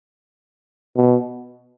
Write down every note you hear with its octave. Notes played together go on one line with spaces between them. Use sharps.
B2